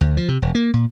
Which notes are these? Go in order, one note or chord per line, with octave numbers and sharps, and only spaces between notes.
D2
F3
C3
E1
A#3
A#2